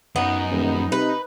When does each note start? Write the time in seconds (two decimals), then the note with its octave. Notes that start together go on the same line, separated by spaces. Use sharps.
0.16 F#2 B3 D#4
0.51 D#1
0.92 C3 B4